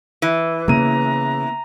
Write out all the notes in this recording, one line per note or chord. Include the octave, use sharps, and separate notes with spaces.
E3
C#3 A#3 B3 A#5 D#7